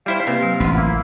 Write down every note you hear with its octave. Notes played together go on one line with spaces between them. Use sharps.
G3 E4 C5 F5
C3 A#3 B4
F#3
A1 C#4 F4 F#5
A#3 E4